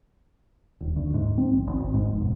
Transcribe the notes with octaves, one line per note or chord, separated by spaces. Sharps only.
D#1
D2
G#2
C4
A#1
G#1
G#1
G#2
F1
B1